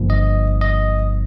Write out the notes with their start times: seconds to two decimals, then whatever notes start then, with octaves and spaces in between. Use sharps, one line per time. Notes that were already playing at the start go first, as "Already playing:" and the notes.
Already playing: G1 G2 F3 A#3
0.10 D#5
0.61 D#5